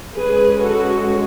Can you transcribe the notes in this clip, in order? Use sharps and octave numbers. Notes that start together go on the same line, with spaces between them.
G#3 C#4 G#4 B4
F#4 A4